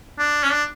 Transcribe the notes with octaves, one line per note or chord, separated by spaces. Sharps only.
D4
C#4
D4